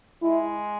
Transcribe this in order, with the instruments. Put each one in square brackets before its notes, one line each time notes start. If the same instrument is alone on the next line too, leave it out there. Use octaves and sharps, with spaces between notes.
[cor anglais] G#3 [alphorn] E4